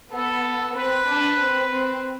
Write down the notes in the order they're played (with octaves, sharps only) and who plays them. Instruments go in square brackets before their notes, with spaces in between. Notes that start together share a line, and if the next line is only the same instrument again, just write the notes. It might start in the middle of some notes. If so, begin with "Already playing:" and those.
[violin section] B3 [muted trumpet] A4
[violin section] C4 [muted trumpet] B4
[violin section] D4
C4
C4